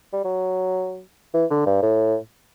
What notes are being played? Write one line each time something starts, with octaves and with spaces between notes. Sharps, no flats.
G3
F#3
E3
D3
G2
A2